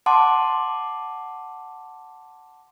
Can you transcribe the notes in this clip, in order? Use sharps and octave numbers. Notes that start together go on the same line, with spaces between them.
F#5 A5 C6 D6